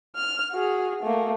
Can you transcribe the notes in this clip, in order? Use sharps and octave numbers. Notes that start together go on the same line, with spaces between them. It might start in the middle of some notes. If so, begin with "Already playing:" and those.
F6
F#4 G#4
A3 A#3